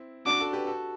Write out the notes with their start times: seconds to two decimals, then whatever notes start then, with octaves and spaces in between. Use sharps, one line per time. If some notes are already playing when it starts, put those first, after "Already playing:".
Already playing: C4 E4
0.26 D4 F#4 D6
0.40 F#4 A4
0.53 G4 B4
0.67 F#4 A4